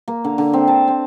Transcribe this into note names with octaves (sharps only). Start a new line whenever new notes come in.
A#3
D3
D3
C4
A5
C4